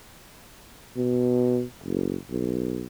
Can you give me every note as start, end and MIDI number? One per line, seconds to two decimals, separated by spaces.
0.97 1.63 47
1.84 2.16 30
2.30 2.87 35